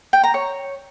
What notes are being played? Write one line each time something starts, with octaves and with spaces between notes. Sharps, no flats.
G5
A#5
C#5